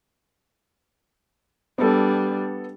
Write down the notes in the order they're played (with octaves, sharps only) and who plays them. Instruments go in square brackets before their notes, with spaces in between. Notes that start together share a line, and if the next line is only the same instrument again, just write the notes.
[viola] G3 D4 [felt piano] B3 A4